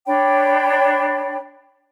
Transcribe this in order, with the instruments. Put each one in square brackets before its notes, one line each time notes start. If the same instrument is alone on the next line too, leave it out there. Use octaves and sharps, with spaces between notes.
[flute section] D4 C#5 G5 B5